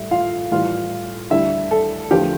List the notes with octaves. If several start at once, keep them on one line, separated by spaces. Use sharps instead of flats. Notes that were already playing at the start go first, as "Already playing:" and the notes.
Already playing: A2 G3 E5
F4 F5
A2 E3 G3 F4 F5
D2 D3 G3 E4 E5
A4
E2 D3 F3 A3 G4